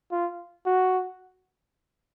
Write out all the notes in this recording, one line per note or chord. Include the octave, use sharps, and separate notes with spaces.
F4
F#4